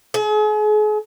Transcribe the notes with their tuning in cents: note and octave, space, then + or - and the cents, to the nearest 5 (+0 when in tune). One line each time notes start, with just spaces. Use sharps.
G#4 +40